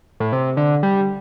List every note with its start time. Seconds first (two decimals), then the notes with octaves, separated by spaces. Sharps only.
0.20 A2
0.33 C3
0.57 D3
0.83 G3